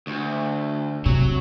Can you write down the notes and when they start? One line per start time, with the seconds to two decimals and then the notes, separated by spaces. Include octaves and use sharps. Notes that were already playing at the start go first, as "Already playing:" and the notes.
0.07 D2
1.06 C3 F#3